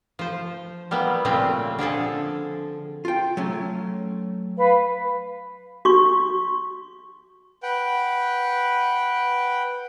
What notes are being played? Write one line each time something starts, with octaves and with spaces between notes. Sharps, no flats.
F3 C5
G3 A#3 B3 E4
A#2 C#3 F3 G3 A3 C4
D3 F3 G#4 A4
F4 G5
F#3 A3 C#4
B4 F5
F#4 C#6
B4 F#5 G5